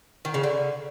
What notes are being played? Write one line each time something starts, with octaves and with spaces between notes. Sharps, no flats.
D#3
C#3
D3